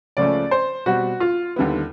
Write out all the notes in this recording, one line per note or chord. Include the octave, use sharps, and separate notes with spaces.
C#2 C#3 F3 A3 C#4 D5
C5
B2 G3 C4 F#4
F4
D#2 D3 G3 B3 E4